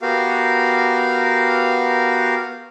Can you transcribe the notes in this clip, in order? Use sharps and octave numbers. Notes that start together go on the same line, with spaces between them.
B3 F#4 G4 A#4 F5